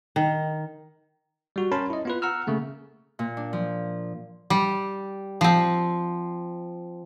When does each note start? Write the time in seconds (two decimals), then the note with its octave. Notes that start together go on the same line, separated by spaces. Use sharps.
0.16 D#3
1.56 G3 F#4
1.72 C#4 A#4 C#5 A5 B5 C6
1.90 E4 D#5
2.05 B3 F4 B4
2.22 F#5 A#5 E6 F6
2.47 C#3 A3 A#3
3.19 A#2
3.37 D4
3.53 F3
4.50 G3
5.41 F3 C4